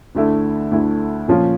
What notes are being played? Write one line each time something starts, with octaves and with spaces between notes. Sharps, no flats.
D2 D3 A3 E4
D2 D3 A3 E4
A#2 F3 C#4 F4